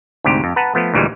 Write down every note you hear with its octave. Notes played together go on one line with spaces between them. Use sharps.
D2 G#2 C3 G4
F2
B4 F#5 A5 A#5
F3 A3 B3
D2 A#2 E3 G3 G#3